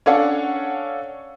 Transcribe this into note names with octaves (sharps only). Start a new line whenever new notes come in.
C#4 D4 A4 C#5 F5 F#5